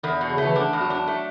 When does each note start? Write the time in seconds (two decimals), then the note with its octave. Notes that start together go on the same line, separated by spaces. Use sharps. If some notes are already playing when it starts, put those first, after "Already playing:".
0.04 E2 D3
0.21 B2
0.30 C#3
0.38 A3
0.45 E3
0.56 D3 D4
0.73 E2
0.81 F#3
0.90 D4
1.07 A3